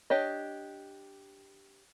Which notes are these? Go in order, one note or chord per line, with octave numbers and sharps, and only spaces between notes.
D4 G4 C#5 D#5